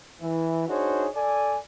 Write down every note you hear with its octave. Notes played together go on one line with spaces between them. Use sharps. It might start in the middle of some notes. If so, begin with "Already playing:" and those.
E3
D4 D#4 F#4 G#4 C5 C#5
A4 D5 G#5